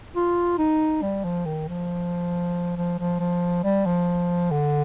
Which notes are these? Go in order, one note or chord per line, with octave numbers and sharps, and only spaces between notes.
F4
D#4
G3
F3
D#3
F3
F3
F3
F3
G3
F3
D3